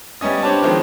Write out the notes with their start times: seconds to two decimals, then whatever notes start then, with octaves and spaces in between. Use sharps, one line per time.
0.21 G3 B3 C#4 D#5
0.43 C4 D4 G4 B4 C#5 A5
0.62 D#3 F3 G#3 B3 C4 D#4